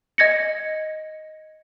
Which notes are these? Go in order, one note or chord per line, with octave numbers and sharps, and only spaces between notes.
D#5 G#6 A#6 C#7